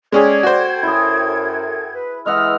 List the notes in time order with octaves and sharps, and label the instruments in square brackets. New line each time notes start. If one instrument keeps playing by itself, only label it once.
[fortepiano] G#3 C#4 G#4 [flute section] A4 G5 G#6 [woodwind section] D5
[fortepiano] F#4 C5
[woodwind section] F#2 [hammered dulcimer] E4 G#4
[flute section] B4
[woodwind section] E3 F6 [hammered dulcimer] G#3 D#5 F#5 [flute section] E6